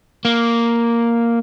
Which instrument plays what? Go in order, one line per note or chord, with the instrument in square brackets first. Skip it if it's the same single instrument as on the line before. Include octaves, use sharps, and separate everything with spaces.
[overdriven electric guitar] A#3